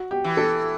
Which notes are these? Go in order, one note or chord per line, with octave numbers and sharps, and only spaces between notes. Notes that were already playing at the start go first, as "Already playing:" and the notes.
Already playing: F#4
G4
E3
A4